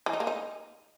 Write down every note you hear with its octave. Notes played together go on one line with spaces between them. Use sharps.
E3
D#4
A#3
D#4